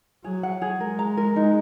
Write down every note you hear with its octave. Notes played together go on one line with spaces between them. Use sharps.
F#3 G#4
F#5
G#4
G#3 A#4
A#5
A#4
D#4